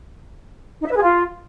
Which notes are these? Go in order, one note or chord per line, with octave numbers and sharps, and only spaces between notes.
D#4
E5
B4
G#4
F4